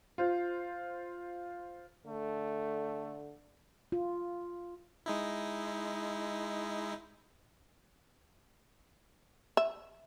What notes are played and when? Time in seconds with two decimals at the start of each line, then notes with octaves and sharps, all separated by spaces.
0.18 F4 C5
2.06 D3 A3
3.92 F4
5.06 G#3 D#4 E4
9.57 E5